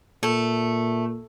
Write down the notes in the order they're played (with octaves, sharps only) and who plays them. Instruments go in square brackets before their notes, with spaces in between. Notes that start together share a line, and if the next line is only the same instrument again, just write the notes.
[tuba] A#2 [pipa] A3